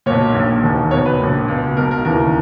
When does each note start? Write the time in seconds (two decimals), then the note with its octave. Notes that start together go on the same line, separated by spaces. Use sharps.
0.06 B1 A#2 C#5
0.35 A#1 A#2
0.63 E1 D#2 D#3
0.91 C#2 B2 C#5
1.06 B4
1.20 A#1 A#2
1.48 C#2 B2
1.76 B1 B2 A#4
1.91 A#4
2.05 E1 D#2 C#3 E3 A#4